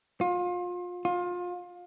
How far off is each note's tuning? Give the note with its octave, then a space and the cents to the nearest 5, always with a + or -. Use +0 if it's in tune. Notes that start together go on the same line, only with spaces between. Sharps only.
F4 +30
F4 +25